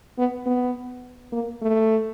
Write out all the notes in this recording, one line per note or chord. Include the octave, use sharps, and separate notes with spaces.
B3
B3
A#3
A3